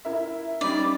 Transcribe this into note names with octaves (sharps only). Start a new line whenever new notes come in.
E4 A#4 E5
G3 C#4 D#4 D5